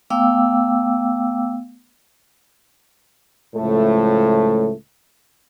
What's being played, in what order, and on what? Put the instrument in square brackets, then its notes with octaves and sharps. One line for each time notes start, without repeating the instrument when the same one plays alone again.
[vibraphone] A3 B3 F5 G5 D6 E6
[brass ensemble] C#2 A2 F3 A3